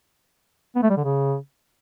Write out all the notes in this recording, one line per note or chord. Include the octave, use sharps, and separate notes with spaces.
B3
A3
G3
D3
C#3